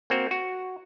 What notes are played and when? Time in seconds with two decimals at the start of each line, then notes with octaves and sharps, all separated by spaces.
0.10 A#3 C4 F#4
0.31 F#4